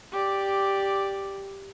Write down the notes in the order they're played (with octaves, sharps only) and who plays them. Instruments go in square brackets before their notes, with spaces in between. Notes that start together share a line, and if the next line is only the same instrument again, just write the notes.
[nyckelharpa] G4 D5